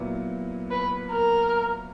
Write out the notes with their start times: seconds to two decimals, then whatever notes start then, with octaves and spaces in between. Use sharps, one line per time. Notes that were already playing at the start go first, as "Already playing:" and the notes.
Already playing: A#2 F#3 B3 E4
0.71 B4
1.12 A#4